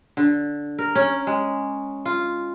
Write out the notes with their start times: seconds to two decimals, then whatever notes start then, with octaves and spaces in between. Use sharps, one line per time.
0.17 D3
0.79 A#4
0.95 C#4
1.27 G#3
2.05 F4